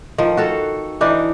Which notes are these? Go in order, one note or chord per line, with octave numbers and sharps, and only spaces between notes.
D#3 F3
F#4 A4 F5
E3 D4 D#4